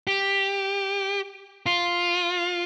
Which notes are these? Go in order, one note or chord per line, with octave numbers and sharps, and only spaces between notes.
G4
F4